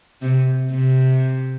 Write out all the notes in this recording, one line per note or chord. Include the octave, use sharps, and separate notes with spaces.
C3
C3